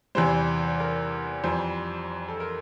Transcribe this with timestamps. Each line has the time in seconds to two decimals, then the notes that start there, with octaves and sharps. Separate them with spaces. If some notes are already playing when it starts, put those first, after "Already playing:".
0.15 E2 C3 E3 G3 C5
0.80 A#4
1.44 F2 E3 G3 C5
2.28 A4
2.40 A#4